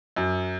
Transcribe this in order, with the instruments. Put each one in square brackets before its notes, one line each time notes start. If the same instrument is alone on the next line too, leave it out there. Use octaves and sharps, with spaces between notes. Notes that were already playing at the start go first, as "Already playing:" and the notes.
[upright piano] F#2